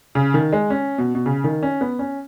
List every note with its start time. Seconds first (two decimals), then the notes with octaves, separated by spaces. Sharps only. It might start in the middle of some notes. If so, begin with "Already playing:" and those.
0.15 C#3
0.34 D#3
0.52 G#3
0.70 C#4
0.98 B2
1.15 B2
1.26 C#3
1.44 D#3
1.63 C#4
1.81 B3
1.99 C#4